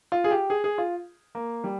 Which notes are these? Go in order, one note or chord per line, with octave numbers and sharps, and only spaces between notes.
F4
G#4
G4
G#4
G#4
F4
A#3
G3